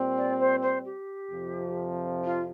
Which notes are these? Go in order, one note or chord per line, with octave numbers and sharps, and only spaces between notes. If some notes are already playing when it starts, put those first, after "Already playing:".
Already playing: A#2 G3 C4
D5
C5
C5
G4
F2 C3 F3
F4